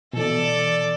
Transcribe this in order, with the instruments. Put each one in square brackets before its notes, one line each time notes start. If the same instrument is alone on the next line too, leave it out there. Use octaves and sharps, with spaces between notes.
[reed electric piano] B2 E3 [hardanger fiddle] A4 D5